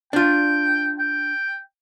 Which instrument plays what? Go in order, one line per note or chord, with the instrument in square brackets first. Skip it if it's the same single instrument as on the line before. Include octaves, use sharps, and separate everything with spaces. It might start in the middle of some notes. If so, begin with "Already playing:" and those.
[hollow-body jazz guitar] D4 F4 [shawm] G5
[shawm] G5